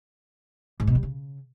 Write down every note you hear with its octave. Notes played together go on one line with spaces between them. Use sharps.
G#2
B2
G3
C#3